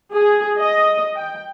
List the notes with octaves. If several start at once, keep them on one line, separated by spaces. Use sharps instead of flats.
G#4
D#5
G5